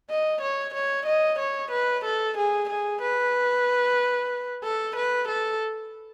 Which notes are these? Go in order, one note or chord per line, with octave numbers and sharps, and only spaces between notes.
D#5
C#5
C#5
D#5
C#5
B4
A4
G#4
G#4
B4
A4
B4
A4